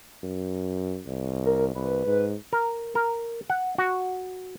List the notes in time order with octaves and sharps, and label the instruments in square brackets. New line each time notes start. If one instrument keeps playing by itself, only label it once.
[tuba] F#2
C2
[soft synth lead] A#4
[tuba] C2 [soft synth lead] B4
[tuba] G#2
[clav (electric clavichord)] A#4
A#4
F#5
F#4